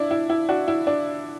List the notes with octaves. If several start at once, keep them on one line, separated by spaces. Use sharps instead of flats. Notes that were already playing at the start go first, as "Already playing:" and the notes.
Already playing: D4 E4
E4
E4
D4 F#4
E4
D4